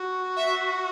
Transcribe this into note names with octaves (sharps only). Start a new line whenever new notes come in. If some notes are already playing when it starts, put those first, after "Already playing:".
Already playing: F#4
E5